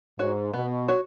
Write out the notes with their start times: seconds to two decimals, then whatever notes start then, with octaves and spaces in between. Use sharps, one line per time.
0.19 G#2 F#4 C#5
0.53 B2 B3
0.88 F#4 C#5